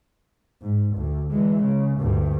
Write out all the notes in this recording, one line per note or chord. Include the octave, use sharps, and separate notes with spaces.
G#2
D2
E3 G#3
C#3
D2 G2